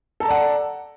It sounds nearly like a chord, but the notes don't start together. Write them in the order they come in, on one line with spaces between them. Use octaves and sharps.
A4 A#5 A5 D5 F#5